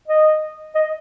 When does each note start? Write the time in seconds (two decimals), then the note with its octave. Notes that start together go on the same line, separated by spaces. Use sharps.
0.08 D#5
0.75 D#5